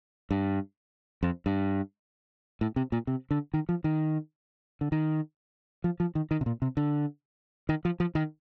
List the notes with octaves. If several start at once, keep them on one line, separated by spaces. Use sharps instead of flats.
G2
F2
G2
A2
C3
A#2
C3
D3
D#3
F3
D#3
D3
D#3
F3
F3
D#3
D#3
C3
A#2
C3
D3
D#3
F3
F3
D#3